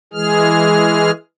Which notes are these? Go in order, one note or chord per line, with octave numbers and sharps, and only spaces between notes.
E3 G#3 G#4 F6